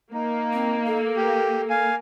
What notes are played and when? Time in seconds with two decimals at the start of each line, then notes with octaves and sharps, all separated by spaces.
0.14 A#3 D#4
0.53 C4
0.87 A4
1.16 G4
1.70 F5 G#5